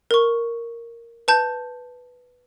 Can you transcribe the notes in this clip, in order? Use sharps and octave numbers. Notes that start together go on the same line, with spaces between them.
A#4 C#6
B4 A5 G6